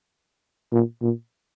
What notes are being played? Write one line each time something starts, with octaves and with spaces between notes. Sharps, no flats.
A#2
A#2